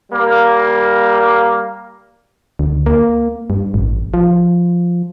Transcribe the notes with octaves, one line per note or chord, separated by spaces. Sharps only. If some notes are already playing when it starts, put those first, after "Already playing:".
G3 A#3
D2
A#3
G2
A1
F3